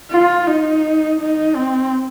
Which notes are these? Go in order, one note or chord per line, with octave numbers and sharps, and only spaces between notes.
F4
D#4
D#4
C4